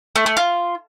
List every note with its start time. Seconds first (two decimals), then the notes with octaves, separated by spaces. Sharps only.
0.16 A3
0.26 A3
0.37 F4